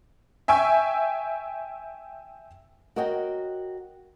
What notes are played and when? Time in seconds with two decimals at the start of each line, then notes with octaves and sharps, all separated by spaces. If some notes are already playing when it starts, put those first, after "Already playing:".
0.48 E5 G5 G#5 C#6 E6
2.96 F#4 A#4 C#5 D#5 F#5 G5